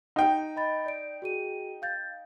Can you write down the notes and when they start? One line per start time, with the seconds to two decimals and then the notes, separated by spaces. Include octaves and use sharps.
0.16 D#4 G5
0.56 D#5 B5 A6
0.86 D5 D7
1.22 F#4 G#4 D#7
1.82 F5 G6 A6